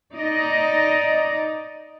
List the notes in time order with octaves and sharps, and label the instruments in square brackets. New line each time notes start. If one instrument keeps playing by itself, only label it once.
[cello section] D#4 D5 D#5